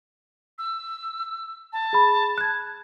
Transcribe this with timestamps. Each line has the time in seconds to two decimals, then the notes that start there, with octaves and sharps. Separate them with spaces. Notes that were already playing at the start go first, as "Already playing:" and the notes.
0.58 E6
1.73 A5
1.93 G#4 B5
2.38 F#6 G#6